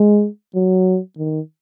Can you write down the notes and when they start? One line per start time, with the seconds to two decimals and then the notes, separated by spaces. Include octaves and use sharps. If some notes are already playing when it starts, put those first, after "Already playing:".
Already playing: G#3
0.55 F#3
1.18 D#3